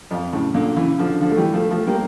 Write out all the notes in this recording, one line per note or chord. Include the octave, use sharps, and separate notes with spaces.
F2
A2 C#3
A#2 D3
C#3 E3
D3 F3
D3 F3
A3
E3 G3
F3 A3
F3 A3
G3 A#3